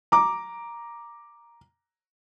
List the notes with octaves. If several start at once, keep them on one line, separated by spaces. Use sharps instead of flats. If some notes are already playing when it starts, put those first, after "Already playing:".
A#5 D6